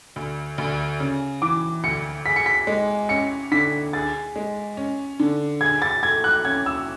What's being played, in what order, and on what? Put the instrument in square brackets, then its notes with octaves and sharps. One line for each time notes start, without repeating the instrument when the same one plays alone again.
[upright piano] D2
D2
C#3
[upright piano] E3 [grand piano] D6
[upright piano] D2 [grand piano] C#7
[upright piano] G#4 [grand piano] B6
[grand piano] C#7
B6
[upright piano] G#3
[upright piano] C#4 [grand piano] C#7
[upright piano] D3 [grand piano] B6
[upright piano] G#4 [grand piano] A6
[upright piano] G#3
C#4
D3
[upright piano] G#4 [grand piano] G#6
[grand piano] A6
[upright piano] A3 [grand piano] G#6
[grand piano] F#6
[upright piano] C#4 [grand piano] G#6
[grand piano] E6